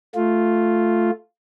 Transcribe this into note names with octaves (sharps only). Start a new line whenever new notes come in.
A3 F4